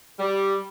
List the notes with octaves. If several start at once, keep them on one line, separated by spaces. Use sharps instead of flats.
G3